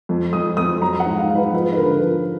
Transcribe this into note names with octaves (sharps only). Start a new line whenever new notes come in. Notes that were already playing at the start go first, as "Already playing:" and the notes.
F2
F2 D#6
F2 D#6
F#3 A#5
F#5
G#2
F5
G#2
B4
F3 B4
B4
D3 A#4
F3